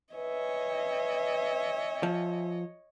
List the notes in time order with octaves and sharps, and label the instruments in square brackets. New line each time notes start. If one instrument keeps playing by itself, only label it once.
[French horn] B4 [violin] C#5 D#5 [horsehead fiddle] E5 G#5
[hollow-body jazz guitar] F3